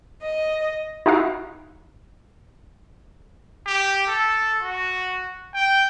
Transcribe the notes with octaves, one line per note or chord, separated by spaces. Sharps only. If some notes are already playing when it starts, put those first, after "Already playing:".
D#5
D#4 E4 F#4 F5
G4
A4
F#4
G5